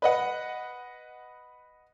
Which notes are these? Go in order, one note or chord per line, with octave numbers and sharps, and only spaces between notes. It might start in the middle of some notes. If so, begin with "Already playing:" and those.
B4 D#5 F#5